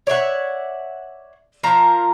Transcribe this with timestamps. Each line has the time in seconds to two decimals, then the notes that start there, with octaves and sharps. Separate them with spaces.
0.07 C#5 D5 E5 F#5
1.63 F3 F4 A#4 A#5